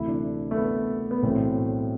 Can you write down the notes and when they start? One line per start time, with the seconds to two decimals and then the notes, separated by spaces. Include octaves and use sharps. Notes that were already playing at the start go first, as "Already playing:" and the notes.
Already playing: D2 C3 E3 E4
0.08 D4
0.51 A3
0.57 B3
1.11 B3
1.23 B1 A2 E3 C4